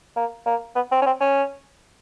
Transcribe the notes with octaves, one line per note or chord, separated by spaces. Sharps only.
A#3
A#3
B3
C4
C#4
C4
C#4